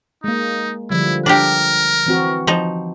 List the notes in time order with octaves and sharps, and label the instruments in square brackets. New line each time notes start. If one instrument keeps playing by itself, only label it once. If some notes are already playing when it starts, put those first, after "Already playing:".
[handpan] G#3 A#3 [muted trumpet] D#4
[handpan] D3 F3 G3 [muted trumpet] E4
[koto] D4 G4 [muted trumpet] A#4
[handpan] E3 C4 F#4
[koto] F3 D#4